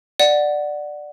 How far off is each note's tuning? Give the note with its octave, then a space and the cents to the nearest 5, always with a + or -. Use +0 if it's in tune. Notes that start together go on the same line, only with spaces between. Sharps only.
D5 +10 F#5 +0